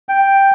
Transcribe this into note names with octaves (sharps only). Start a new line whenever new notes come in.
G5